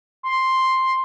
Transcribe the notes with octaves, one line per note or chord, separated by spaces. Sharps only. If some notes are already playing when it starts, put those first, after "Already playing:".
C6